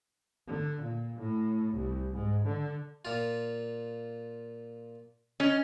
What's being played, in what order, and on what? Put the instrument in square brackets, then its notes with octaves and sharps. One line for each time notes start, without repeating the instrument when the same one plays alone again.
[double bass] D3
A#2
A2
C2
G#2
D3
[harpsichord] A#2 F4
[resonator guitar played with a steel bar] C#4 [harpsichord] D#5